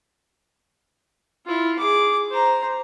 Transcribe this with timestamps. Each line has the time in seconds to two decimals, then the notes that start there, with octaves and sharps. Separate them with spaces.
1.46 E4 F4
1.78 G#4 D6
2.30 C5 A#5